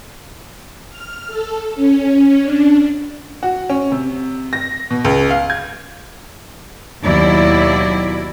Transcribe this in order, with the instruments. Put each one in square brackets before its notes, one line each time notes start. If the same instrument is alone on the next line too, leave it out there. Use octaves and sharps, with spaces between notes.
[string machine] F6
A4
C#4
D4
[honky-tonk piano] F#4
C#4
C3
A#6
B2
C#2
F5
G#6
[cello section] D#2 B2 F#3 E4 D5